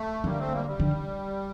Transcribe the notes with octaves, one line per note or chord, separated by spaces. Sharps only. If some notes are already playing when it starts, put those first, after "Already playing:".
Already playing: A3
D3 G3 A#3
A3 C4
G3 A#3
G3
D3